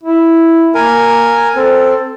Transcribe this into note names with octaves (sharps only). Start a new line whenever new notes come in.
E4
A#3 A#4 G#5
C4 A4